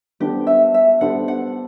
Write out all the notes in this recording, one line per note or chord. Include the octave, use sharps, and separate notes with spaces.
G3 B3 D4 G4 A4 C5
E5
E5
G3 B3 D4 A4 C5 F#5
F#5